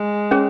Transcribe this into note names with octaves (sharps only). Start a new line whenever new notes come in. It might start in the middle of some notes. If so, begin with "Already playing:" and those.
Already playing: G#3
C#4 G#4 C#5